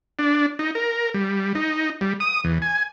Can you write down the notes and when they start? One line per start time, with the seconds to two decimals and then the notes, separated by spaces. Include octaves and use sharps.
0.19 D4
0.59 D#4
0.75 A#4
1.14 G3
1.55 D#4
2.01 G3
2.20 D#6
2.44 E2
2.62 G#5